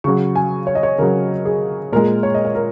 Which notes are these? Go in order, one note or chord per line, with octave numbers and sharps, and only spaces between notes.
C#3 F#3 C#6
G#5
C#5
D#5
C#5
C#3 F#3 A#4
G#4
A#2 G#3 A#4
C#5
D#5
C#5
A#4